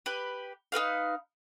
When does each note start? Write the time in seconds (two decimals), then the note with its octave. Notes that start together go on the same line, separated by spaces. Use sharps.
0.06 G4 B4
0.72 D#4 A#4 B4 F5